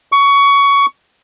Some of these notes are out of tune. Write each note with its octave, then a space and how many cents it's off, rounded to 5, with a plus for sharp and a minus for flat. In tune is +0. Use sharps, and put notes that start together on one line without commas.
C#6 +20